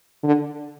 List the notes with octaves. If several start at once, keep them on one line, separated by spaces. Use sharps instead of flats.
D3